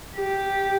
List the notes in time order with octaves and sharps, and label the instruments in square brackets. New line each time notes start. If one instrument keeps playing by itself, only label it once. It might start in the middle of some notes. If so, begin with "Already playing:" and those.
[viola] G4